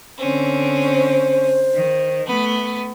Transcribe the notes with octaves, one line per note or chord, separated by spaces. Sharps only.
D3 C4 C#4
C5
D#3
A3 B3